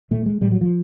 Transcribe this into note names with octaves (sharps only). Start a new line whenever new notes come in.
A#2 A3
G#3
A2 G3
F#3
F3